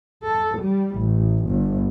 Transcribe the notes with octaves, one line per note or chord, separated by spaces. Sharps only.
A4
G3
A1
G1